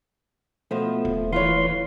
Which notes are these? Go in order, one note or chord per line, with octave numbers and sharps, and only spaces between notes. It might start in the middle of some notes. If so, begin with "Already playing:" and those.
B2 F3 A3
D#1
E3 F4 B4 C#5 C6